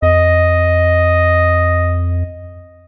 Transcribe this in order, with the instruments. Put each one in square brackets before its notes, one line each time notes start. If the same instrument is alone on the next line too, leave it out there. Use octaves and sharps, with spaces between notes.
[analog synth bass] F2 [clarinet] D#5